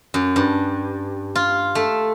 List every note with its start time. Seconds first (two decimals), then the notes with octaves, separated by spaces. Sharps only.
0.14 F#2
0.36 G2
1.35 F4
1.75 A3